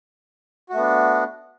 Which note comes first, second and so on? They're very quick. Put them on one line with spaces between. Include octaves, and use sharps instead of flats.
F#4 A3 B3 D4